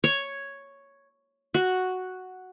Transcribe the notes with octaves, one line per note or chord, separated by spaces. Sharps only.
C#5
F#4